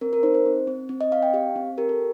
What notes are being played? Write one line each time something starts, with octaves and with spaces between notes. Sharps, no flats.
C4 A#4
A#4
D#4 C5
C5
C4
C4
C4
D#5
C4 F5
G5
G4 F5
C4
G4 A#4
A4